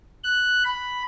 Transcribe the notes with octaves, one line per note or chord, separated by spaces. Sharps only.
F#6
B5